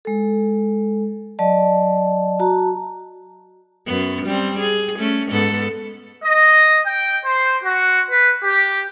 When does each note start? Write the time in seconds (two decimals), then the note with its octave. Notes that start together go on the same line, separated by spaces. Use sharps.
0.05 G#3 A4
1.39 F#3 D5 D#5 A5
2.40 F#4 A5 A#5
3.87 F#2 B3
4.26 G3 C4
4.60 G#4
4.98 A3 C#4
5.29 G#2 B3 A4
6.24 D#5
6.87 G5
7.25 C5
7.64 F#4
8.10 B4
8.44 G4